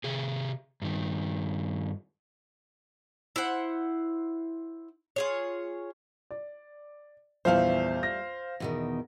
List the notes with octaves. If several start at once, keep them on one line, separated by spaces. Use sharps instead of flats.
C3 G#4
G2 D#3
E4 C5 F#5
F4 G#4 C#5
D5
A#1 E2 G3 A3 C5 E5 F5
A#6
E2 B2 D#3